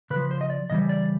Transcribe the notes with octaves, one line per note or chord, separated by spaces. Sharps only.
C#3 B4
F3
C5
D#5
D5
C#3 E3 G3 D#5
D5